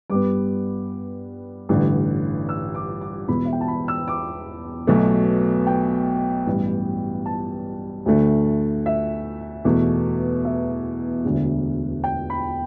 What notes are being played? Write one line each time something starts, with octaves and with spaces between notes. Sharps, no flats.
G2 G3 B3 D6
A1 G2 D3
E6
D6
D6
E1 E2 B2 B5
E5
G5
A5
B5
E6
D6
B1 B2 A3
G5
A1 G2 G3 B3
A5
D2 D3 A3
E5
E2 B2 A3
E5
E1 D2 D3
G5
B5